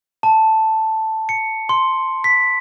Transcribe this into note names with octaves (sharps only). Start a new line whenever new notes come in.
A5
C#7
C6
B6